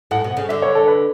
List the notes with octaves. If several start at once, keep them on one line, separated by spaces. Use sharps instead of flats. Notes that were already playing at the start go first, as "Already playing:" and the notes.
A2 F#5
B2
F#5
C#3
D3 E5
C#5
A4
B4